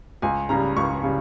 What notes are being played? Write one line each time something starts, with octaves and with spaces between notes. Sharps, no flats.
C#2 G#5
C#3 G3 A#5
C#2 C#6
C#3 G3